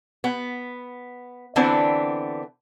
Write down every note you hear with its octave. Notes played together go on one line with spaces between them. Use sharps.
B3
D3 E3 B3 C4 D4